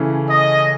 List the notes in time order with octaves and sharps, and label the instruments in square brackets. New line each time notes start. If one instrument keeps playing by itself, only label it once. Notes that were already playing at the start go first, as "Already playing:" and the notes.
Already playing: [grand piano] C#3 E3 A3 C#4
[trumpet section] D#5